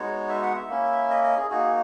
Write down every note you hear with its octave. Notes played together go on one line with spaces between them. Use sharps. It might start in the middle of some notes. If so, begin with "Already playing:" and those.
Already playing: G#3 B3 D#4 F#4 C#5
E5
F#5
E5
A#3 C#4 E4
D#5
D#5
G#4
A#3 D#4 F#4 G#4